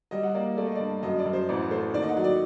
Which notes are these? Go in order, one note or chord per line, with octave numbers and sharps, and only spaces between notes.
G3 D#5
F#5
A#3 D5
A3 D5
D#5
G2 D5
F#2 D#5
D5
F#2
C5
A1 D5
A3 C5
D#2 D5
D#5
F#5
F#3
D5